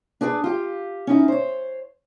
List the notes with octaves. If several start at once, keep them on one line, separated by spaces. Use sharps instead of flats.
D4 G#4 B4 C5 D5
F4 G4
C#4 D#4 E4
C5 C#5